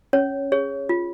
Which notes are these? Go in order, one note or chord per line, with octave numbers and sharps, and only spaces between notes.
C#4 C#5
G#4 C#5
F4